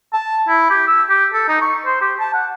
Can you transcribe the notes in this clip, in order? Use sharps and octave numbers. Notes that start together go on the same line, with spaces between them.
A5
E4
G4
E6
G4
A4
D#4
C#6
C5
G4
A5
F#5